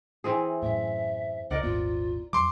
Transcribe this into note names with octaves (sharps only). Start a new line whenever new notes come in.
E3 C4 G#4
F#2 A2 E5
C#2 A#4 D5 D#5 F#5
D#1 G#1 B3 F4
F2 F#3 C6 D6